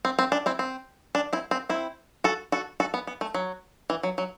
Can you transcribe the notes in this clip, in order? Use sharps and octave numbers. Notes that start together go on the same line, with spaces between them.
C4
C4
D4
C4 E4
C4
D4
C4 E4
C4
C4 E4
F#4 A4
F#4 A4
F#4 A4
B3
B3
A3
F#3
E3
F#3
F#3